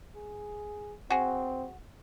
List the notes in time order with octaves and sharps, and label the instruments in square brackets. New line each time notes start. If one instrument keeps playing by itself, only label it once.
[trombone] G#4
[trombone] C4 [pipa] F#4 G#4